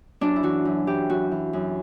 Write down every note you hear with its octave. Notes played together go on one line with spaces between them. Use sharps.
F#2 D4
E4
E3 F#4
F#2
E3 G4
F#2 F#4
E3
F#2